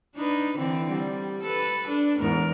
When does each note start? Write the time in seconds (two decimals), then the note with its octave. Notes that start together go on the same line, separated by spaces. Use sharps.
0.16 D4 D#4 B4
0.58 D3 E3 C4
0.90 G3
1.43 A4 B4
1.88 D4
2.19 E2 G#2 A#4